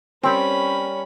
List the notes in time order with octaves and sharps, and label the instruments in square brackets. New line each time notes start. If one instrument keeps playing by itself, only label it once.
[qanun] G3 A#4 [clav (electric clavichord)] C4 [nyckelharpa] C#4 B5 [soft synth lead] C#5